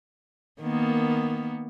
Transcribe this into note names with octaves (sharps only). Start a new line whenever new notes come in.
D#3 A#3 B3